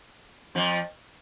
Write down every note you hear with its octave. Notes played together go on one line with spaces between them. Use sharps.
F2 F3